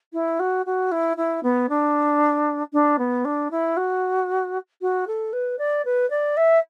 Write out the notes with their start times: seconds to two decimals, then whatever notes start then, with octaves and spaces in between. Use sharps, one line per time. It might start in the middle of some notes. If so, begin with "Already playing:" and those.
0.13 E4
0.40 F#4
0.66 F#4
0.92 E4
1.17 E4
1.43 B3
1.69 D4
2.73 D4
2.99 B3
3.25 D4
3.51 E4
3.77 F#4
4.82 F#4
5.07 A4
5.33 B4
5.59 D5
5.85 B4
6.10 D5
6.37 E5